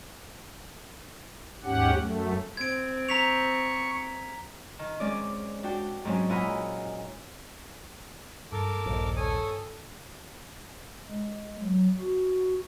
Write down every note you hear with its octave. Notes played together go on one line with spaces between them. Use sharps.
D#2 G#2 C#4 G4 F#5
F#2 A3
C4 G#6 D7
A#5 C#6 B6 F7
D#3
G#3 C4 C#4 D5 D6
D4 F#4 G5
G#2 F#3 C4 C#4 G#4
A#2 E4 D#5 F#5 A#5 B5
G2 A4 A#4 D6
A#1 D#2
A4 C#5 G#5 D#6
G#3
F#3
F#4